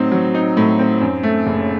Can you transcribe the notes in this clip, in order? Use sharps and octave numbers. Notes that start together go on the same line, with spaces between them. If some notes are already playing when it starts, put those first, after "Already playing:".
Already playing: A2 F#3 C4 D#4
F#3
D#4
A2
C4
F#2
A3
F#1